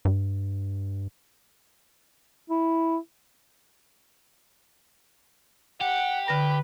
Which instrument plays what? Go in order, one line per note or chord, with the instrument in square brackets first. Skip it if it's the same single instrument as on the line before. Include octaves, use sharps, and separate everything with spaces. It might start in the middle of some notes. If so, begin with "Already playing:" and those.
[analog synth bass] G2
[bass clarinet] E4
[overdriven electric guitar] G4 [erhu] F#5
[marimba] D3 A#6 [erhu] B4